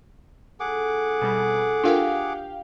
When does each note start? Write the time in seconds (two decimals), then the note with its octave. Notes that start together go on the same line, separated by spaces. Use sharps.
0.60 F2 E4 G#4 A4 F#5 D6
1.22 B2 G3
1.84 D4 F4 G4 A#4 F5 G5